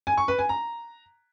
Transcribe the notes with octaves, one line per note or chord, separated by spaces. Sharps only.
G#5
C#6
B4
G#5
A#5